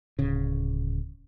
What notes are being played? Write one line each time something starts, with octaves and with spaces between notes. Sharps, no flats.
D1 C#3